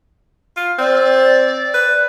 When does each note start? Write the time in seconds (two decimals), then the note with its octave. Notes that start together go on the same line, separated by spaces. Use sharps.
0.57 F4
0.79 C4 D5
1.74 B4